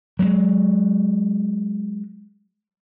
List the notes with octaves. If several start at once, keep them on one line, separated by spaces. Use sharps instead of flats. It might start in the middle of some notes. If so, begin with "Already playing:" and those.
F#3 G#3